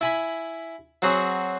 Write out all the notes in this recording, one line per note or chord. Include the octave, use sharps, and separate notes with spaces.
E4 G#5 B5
F#3 C4 F#4 G#4